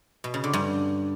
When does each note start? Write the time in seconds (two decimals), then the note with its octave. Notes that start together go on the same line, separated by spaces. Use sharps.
0.24 B2
0.34 C#3
0.44 D3
0.53 G2